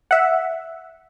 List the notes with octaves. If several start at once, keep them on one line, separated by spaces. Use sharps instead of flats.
E5 F#5